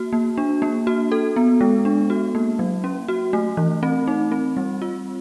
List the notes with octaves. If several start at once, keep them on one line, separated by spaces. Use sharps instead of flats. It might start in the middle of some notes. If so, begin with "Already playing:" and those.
Already playing: A#3 F#4
A#3
D4
A#3
F#4
A4
B3
G#3
D4
F#4
A#3
F#3
C#4
F#4
A3
E3
C4
D#4
C4
G3
F4